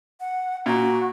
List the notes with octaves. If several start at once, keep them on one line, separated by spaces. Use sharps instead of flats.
F#5
A#2 F#4